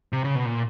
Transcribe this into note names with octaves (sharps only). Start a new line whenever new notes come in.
C3
C#3
B2
A#2